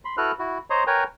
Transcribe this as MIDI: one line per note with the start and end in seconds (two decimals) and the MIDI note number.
0.05 0.16 83
0.05 0.16 84
0.17 0.32 64
0.17 0.32 66
0.17 0.32 69
0.17 0.32 71
0.17 0.32 89
0.17 0.32 90
0.39 0.58 64
0.39 0.58 66
0.70 0.84 72
0.70 0.84 73
0.70 0.84 75
0.70 0.84 82
0.70 0.84 84
0.87 1.04 70
0.87 1.04 71
0.87 1.04 73
0.87 1.04 79
0.87 1.04 80
0.87 1.04 82